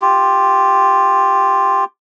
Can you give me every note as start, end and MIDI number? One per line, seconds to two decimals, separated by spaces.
0.02 1.84 65
0.02 1.84 67